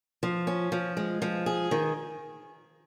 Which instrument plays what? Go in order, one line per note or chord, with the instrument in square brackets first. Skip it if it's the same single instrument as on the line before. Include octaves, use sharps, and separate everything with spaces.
[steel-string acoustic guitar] F3
C#4
F3
G#3
F3
G#4
D#3